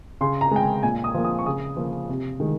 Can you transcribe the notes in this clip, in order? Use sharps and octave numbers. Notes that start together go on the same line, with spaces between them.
C#3 C6
A#5
G#3 G5
G#5
A#2 G#5
D#6
F3 A#3
D#6
C#6
C#3 D#6
F3 A#3
C3
D#3 G#3